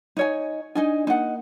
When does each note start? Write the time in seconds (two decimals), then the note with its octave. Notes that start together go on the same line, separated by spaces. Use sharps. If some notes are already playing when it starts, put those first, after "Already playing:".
0.17 D#4 C#5 G#5
0.75 D4 D#4 D#5 G#5
1.07 A#3 D#4 F#5